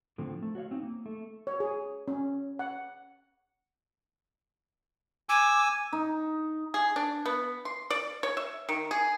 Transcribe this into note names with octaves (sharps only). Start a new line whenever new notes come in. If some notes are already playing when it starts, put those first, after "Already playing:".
A2 D3 F3 A#3 C4
A3
F#4 C#5 E5 F5
C4 D#4
A#3
A3
C#5
G#4
C#4
F#5
G#5 D6 E6
D#4
G#4
D4
B3
C6
D5
C#5
E5
D#3
G#4